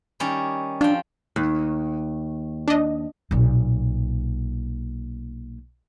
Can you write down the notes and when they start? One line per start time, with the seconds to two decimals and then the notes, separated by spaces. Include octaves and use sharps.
0.20 D#3 G3 C#4
0.81 F3 D4 G5
1.36 D#2
2.68 D4 D#5
3.31 B1 A#2